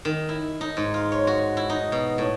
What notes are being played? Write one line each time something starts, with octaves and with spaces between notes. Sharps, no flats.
D#3
E4
D#4
G#2
F4
C#5
F#4
E4
D#4
B2
A2